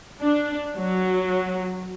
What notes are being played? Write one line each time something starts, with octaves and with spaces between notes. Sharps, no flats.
D4
F#3